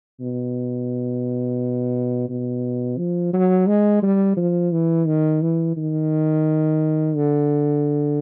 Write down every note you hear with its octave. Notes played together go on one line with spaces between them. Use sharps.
B2
B2
F3
F#3
G#3
G3
F3
E3
D#3
E3
D#3
D3